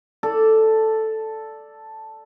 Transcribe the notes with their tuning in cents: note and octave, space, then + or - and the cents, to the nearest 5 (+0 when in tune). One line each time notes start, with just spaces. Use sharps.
A4 +0 D5 +0